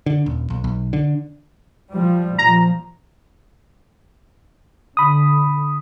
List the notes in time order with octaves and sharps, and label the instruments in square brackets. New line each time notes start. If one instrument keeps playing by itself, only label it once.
[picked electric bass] D3
D#1
B1
B1
D3
[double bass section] F3 G3
[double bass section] A#2 F3 [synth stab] A#5
[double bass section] D3 [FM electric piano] B5 D#6